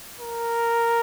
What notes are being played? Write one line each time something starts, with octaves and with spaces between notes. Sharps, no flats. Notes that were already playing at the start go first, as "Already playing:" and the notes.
A#4